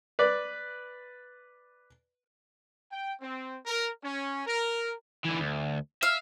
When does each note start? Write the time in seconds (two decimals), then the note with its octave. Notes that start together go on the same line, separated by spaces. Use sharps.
0.19 B4 D5
2.92 G5
3.21 C4
3.66 A#4
4.04 C#4
4.46 A#4
5.25 D3 E3
5.40 D2
6.03 E5 F5